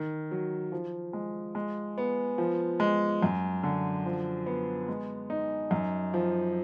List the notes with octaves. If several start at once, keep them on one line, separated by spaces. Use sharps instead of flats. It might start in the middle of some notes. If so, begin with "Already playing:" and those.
Already playing: D#3
F#3
F3
G#3
G#3
B3
F3
G#3
F#2
D3
F3
B3
G#3
D#4
F#2
F3